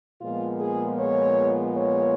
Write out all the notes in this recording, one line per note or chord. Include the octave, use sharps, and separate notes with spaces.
A#2 F3 G#3 B3 F4
G#4
C#5
C#5